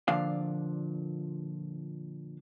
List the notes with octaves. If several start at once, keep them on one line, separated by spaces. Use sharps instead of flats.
A#2 D3 F3 D4 F5